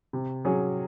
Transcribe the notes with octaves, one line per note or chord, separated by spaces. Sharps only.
C3
F#3 C#4 G#4